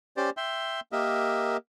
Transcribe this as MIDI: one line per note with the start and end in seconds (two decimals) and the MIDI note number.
0.17 0.30 61
0.17 0.30 67
0.17 0.30 72
0.17 0.30 74
0.37 0.80 76
0.37 0.80 79
0.37 0.80 84
0.92 1.57 58
0.92 1.57 67
0.92 1.57 70
0.92 1.57 75
0.92 1.57 76